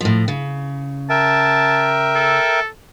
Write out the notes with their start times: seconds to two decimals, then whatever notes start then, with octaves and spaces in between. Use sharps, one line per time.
0.01 A2 F3
0.28 C#3
1.10 A#4 E5 G5 A5
2.15 A4